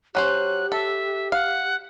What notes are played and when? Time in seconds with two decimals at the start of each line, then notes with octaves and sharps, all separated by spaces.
0.15 F#3 C#4 G4 C5 F#6
0.72 A4 E5
1.32 F5 F#5